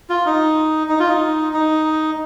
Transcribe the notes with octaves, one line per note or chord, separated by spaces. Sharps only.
F4
D#4
D#4
F4
D#4
D#4